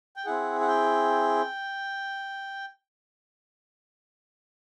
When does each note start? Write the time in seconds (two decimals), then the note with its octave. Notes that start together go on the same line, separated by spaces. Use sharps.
0.16 G5
0.25 C4 E4 G#4 F#5
0.61 F#5
0.68 G5